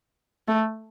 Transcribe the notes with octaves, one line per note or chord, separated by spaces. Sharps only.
A3